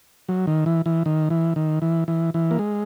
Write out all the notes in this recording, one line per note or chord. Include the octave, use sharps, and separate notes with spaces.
F#3
D#3
E3
E3
D#3
E3
D#3
E3
E3
E3
A#3
G#3